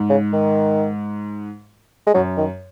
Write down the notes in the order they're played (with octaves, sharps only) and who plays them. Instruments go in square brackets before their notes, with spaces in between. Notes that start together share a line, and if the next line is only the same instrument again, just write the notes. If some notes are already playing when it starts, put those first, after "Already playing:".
Already playing: [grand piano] G#2
[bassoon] C#3
D#3
G#3
[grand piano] F#2 [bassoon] F#3
[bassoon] D#3